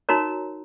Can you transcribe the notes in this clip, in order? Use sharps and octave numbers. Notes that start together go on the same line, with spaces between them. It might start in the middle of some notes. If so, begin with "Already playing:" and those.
D#4 F#4 A#4 C#5 A#5